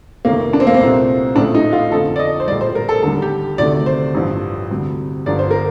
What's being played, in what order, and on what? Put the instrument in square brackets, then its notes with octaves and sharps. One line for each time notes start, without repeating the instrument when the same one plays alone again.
[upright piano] F1 D#2 D#3 A3 A#3
D4
C4
A#3
C4
C2 A#2 A3
A#1 A2 F3 A3 D4
D#4
F4
F2 D3 F3 A4
D5
D#5
C5
A#1 A2 G3 D5
C5
A#4
A4
D#2 D3 G3 A4
G4
D2 C3 D#3 A3 D5
C5
A1 G2 F3
D2 C3 G3
G1 G2 D3 F3 D5
C5
A#4